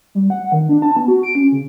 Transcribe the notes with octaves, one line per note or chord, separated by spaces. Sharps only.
G3
F#5
D#3
D4
A5
B3
F#4
D7
C#4
C#3